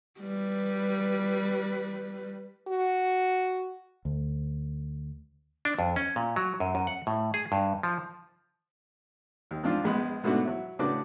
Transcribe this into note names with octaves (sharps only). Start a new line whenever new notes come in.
G3 B4
F#4
D2
D4
F2
C#4
A#2
F#3
F#2
F#2
F#5
A2
G#4
G2
F3
D#2
G#2 F3 C4 D4 F4
A#1 G#3 B3 B5
G#2 B2 A3 B3 D4 F#4
F#3 E4
A2 C#3 D4 F#4 B4 D6